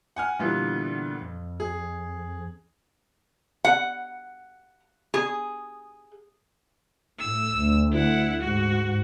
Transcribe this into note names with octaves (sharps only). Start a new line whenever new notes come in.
F#5 G#5 F6
A#2 D3 E3 G3 B3
F2
G#4
F#5
G#4
A2 E6
D2
E4 F#5
G#2 F#4